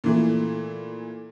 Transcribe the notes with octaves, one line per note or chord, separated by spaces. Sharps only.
A#2 E3 A3